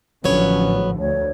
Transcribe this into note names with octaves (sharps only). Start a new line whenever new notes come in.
A1 D3 F3 F#3 B3 C#4 C#5
D2 C#5